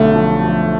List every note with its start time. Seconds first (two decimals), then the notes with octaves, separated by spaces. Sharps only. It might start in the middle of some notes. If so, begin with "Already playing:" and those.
Already playing: B1 D3 A3
0.15 F3
0.43 F3